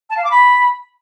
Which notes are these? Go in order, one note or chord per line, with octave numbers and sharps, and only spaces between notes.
A5
F5
D6
B5